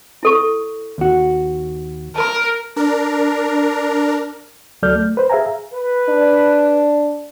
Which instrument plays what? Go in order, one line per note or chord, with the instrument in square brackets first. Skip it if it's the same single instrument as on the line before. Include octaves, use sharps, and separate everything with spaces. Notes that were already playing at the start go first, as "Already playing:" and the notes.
[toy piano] E4 A4 C#6
[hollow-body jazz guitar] D#2 F#4
[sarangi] A#4 [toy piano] A5 B5
[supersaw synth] D4 A#4
[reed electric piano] D2 F#3 A4 D5 F6 G6
A3
B4 C5
G#4 E5 F5 G#5 A#5
[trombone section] B4
[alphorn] D4